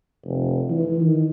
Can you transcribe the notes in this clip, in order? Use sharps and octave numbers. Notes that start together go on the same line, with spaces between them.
F1
E3
D#3